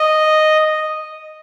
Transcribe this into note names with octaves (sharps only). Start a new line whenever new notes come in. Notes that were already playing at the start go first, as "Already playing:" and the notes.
Already playing: D#5